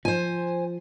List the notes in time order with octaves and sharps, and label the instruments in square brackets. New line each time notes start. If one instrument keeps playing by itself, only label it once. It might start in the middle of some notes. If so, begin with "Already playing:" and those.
[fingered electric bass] F3 [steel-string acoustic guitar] C5 G#5